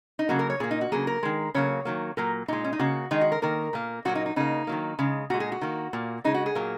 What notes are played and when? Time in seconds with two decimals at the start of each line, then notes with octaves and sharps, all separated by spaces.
0.19 D#4
0.29 C#3 F#3 A#3 F#4
0.39 A#4
0.50 C#5
0.60 A#2 A#3 G#4
0.71 D#4
0.81 F#4
0.92 C#3 F#3 A#3 G#4
1.07 A#4
1.23 D#3 G#3
1.54 C#3 F#3 A#3 C#5
1.85 D#3 F#3 A#3
2.17 A#2 F#3 A#3 A#4
2.48 A#2 G#3 D#4
2.64 C#4
2.73 D#4
2.79 C#3 A#3 F#4
3.11 D#3 G#3 D#4
3.21 F#4
3.32 A#4
3.42 D#3 A#3 A#4
3.73 A#2 A#3
4.05 A#2 F#3 A#3 F#4
4.15 D#4
4.26 D#4
4.36 C#3 A#3 D#4
4.67 D#3 F#3 A#3
4.99 C#3 G#3
5.30 A#2 G#3 F#4
5.40 G#4
5.52 F#4
5.61 D#3 A#3
5.93 A#2 A#3
6.24 C#3 G#3 D#4
6.34 F#4
6.46 G#4
6.55 A#2 F#3 A#3